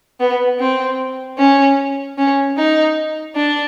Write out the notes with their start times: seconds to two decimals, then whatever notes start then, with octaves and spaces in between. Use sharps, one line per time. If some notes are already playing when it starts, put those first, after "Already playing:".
0.20 B3
0.59 C4
1.38 C#4
2.18 C#4
2.57 D#4
3.36 D4